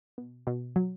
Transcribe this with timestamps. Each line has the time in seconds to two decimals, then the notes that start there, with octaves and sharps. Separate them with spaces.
0.18 B2
0.47 B2
0.76 F#3